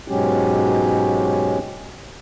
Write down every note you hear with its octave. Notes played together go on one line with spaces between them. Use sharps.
G#2 B2 F#3 G#3 C#4 G4